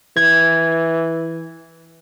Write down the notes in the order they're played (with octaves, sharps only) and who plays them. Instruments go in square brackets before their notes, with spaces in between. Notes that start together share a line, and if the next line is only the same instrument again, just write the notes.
[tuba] E3 [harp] G#6